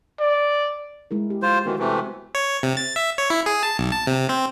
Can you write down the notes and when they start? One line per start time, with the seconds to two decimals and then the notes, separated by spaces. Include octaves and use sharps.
0.20 D5
1.11 G#3 E4 A#4
1.30 G4
1.42 G#3 F4 C5
1.66 D#3 E3 B3 E4 F#4
1.79 C3 E3 A3
2.35 C#5
2.63 C3
2.77 A6
2.96 E5
3.18 C#5
3.30 E4
3.46 G#4
3.63 A5
3.79 B1
3.92 A5
4.07 C3
4.29 C4